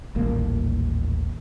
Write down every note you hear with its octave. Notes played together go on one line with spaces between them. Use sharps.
D#1 A1 D#2 A#3